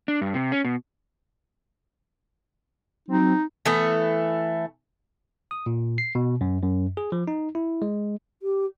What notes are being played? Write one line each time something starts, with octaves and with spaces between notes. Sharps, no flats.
D4
G2
C3
C#4
B2
F#3 C4 D#4
E3 A3 B3 A4
D#6
A#2
C7
B2
F#2
F#2
G#4
F3
D#4
E4
G#3
G4